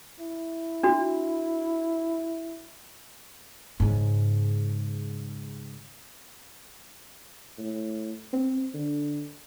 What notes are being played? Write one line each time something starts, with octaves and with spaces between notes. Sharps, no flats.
E4
D4 F#4
G#2 C#3
A2
C4
D3